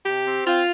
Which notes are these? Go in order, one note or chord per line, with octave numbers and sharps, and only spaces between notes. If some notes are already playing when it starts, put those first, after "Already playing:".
C3 G4
C4
C4 F4